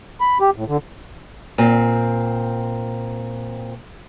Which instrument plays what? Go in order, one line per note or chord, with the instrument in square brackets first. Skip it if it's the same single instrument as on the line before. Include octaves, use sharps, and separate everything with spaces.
[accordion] B5
G4
A2
D3
[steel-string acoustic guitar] A#2 C4